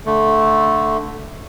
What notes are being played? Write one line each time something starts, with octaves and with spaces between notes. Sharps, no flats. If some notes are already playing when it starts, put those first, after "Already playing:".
D3 A3